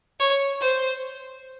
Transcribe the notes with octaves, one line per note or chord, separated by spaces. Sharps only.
C#5
C5